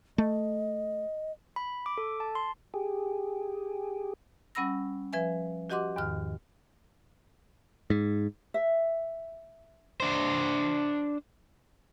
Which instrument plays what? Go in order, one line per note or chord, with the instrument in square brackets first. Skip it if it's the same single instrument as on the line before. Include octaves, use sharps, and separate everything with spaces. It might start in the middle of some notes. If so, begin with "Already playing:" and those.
[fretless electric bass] A3 [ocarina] D#5
[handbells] B5
D6
A4
A5
C6
[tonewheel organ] G4 G#4
[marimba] G3 C#4 F#5 B5 E6 A#6
F3 B4 E5 G#5
F#4 G4 D#5 F#5 C6 D6
E2 G#2 D#3 F6
[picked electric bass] G#2
[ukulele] E5
[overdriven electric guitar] D4 C5